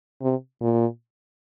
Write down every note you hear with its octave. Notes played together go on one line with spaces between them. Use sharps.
C3
A#2